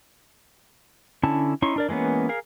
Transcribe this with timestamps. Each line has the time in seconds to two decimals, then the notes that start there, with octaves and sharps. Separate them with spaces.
1.23 D3 C#4 E4 A5
1.62 C#4 D#4 E4 C6 C#6
1.76 D4 A#4 D5
1.89 E3 G#3 A#3 B3 C#4
2.29 G#4 A#4 F5